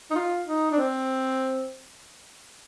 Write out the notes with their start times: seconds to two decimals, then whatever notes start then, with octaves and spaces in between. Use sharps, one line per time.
0.11 D#4
0.15 F4
0.47 D#4
0.71 D4
0.78 C4